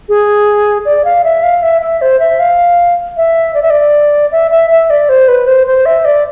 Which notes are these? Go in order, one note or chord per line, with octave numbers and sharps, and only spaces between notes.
G#4
D5
F5
E5
F5
E5
E5
C5
E5
F5
E5
D5
E5
D5
E5
E5
E5
D5
C5
B4
C5
C5
E5
D5